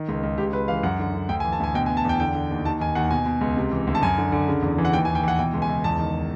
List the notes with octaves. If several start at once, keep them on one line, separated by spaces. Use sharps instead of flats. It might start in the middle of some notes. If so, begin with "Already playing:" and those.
Already playing: D#3
C#2
C#2
C#2 G4
C#2 B4
E3 F5
F#2 F#5
D3
D3
D2 G5
G#5
E3
A5
D2 G#5
B2 G5
G#5
B2
A5
E2 G5
D3 G5
D3
D#2
D#2 A5
D#3 G#5
D#2 F#5
B2 G#5
B2
C#2
C3
E3
D2
A5
F#2 G#5
D3
D3
C#3
E2
E3
F#5
D#2 G5
G#5
D#2
G5
E3 F#5
B2 G5
C#2
G#5
C#2
E2 A5
D#3